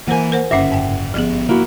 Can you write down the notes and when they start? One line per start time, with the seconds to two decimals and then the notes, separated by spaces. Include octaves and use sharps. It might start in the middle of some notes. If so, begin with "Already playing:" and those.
0.07 E3 A#3 A#4 C5 F#5 G#5
0.32 A#4 C5 F#5
0.51 F#1 G2 D3 C#4 E5 F#5
0.72 G#2 G5
1.14 G#1 D#3 F3 B3 G#4
1.49 A#3 E4 F#4